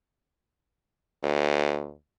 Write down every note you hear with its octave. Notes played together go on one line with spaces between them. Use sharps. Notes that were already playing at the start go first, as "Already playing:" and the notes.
D2